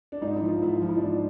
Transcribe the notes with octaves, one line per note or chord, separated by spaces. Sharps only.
D4
G#2 D#4
E4
F3
F4
G#2 E4
F4
F3
E4
D#4
G#2 D4